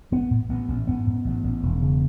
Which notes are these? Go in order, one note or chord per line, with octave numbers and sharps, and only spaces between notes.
A1 B3
A2
A1 B3
A1
G#2 B3
G#2
A1
A1
E1
C#3